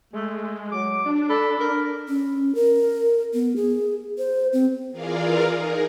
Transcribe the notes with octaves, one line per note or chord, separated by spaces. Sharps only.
G#3 A3
F#3 D6
D4
A4 B5
A#4
C#4
A#4
B3
G#4
C5
C4
E3 F4 G#4 A#4 D5 F5
D#4 G#4 A#4